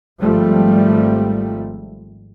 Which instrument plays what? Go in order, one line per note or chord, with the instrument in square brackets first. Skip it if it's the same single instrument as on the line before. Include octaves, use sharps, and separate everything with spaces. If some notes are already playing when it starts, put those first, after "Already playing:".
[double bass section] G#1 F3 G3 A3